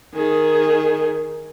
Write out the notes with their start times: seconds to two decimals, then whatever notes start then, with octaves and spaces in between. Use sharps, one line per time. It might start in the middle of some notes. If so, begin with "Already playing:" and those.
0.14 D#3 G#4